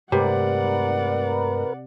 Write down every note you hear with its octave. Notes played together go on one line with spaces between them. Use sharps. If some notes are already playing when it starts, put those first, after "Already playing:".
G2 C3 G#3 A3 A#4 B4 D5 F#5